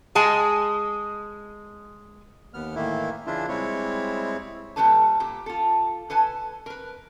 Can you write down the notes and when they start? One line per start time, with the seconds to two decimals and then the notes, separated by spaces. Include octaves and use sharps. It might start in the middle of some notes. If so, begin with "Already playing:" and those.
0.15 G#3 G#5 A5
2.54 D#2 B3 F6
2.75 A2 D#3 E3 A#3 E4
3.27 C#3 E3 D4 E4 F4
3.49 G3 G#3 C4 E4 C#5
4.76 A#2 G3 D#4 A4 B4 A5
5.20 A#2 G4
5.46 F4 A4
6.10 A4 B4 G#5 A5
6.66 A#4 B4